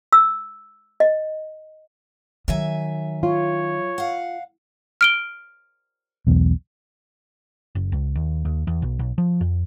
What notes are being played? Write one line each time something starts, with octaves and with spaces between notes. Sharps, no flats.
E6
D#5
D#3 F#3 E5 G#5
F4 C#5
F5 F#5
F6 D7 G7
B1 E2
F#1
C#2
D#2
D#2
E2
B1
B1
F3
F2